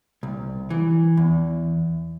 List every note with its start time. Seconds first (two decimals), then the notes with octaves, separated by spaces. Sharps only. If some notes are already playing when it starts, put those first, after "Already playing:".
0.23 C2
0.70 E3
1.17 E2